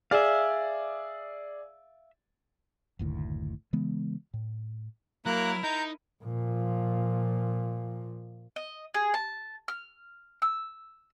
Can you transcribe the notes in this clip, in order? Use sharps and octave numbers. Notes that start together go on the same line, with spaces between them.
G#4 D5 E5 F5
F#1 D2 A2 D#3
C#3 E3 G#3 B3
A2
F#3 A#3 E4 A#4 A#5 F#6
D#4 A#5 G6
A#2 F3
D#5
G#4
A5
F6
E6